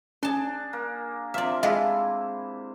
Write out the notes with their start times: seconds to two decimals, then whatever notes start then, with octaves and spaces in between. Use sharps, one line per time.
0.23 C#4 D4 G#4 A5 C6
0.73 A#3
1.34 C3 F3 D5 E5 F5
1.63 G#3 E4 F4 A4 D#5 E5